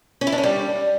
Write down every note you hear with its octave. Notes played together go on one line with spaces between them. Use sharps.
C#4
E4
D4
C#4
G3